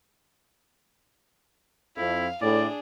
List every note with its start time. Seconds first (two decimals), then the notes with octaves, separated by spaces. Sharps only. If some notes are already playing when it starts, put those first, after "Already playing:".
1.97 F2 E4 F5
2.42 A2 D4 G#4 D5